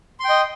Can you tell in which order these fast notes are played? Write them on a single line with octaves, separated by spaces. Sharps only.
C6 G5 D#5